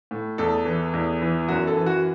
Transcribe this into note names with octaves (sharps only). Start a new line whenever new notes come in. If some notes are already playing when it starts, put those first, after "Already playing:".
A2
E2 A4
E3
E2
E3
F#2 F#4
A4
E3
F#4